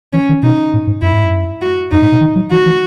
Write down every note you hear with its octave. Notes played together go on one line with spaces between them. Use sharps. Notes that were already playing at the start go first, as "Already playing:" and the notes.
E3 C#4
D#3
B2 D#4
A2
G#2
F#2 E4
G#2
F#2
F#4
F#2 D#4
A2
B2
D#3
F#3
E3 F#4
E3